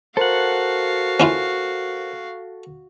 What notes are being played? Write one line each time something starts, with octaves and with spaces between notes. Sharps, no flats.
F#4 A4 A#4 C5 F5 F#5
C#4 E4 F4